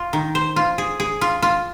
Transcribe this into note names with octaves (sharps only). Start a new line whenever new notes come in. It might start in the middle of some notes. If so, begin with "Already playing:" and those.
Already playing: F4
D#3
C5
F4
G#4
G#4
F4
F4